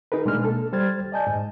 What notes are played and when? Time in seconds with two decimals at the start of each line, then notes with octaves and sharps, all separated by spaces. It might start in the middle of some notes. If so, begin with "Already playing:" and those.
0.12 D#4 G#4 A#4 B4
0.25 B2 G#3 A#3 D4 F6
0.45 A4
0.73 G3 C5 F6 G#6 A6
1.12 D5 D#5 G#5 A5 G6
1.27 G#2